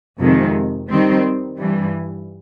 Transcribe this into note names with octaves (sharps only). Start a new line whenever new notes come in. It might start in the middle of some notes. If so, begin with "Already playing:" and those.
F2 C3 D#3 G#3
D#3 G3 C4
G2 E3 G3